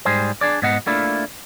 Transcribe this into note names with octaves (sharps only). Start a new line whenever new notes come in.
G#2 G3 G#4 C5
D4 G#4 D5
G#2 B3 D#5 F#5
A3 A#3 D4 E4 F4